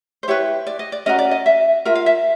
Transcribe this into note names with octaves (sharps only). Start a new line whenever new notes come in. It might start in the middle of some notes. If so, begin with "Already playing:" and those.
C5
E4 G4 B4 C#5
D5
D#5
D5
C#4 F#4 A#4 D#5
D5
D#5
E5
F4 A#4 E5
F5
E5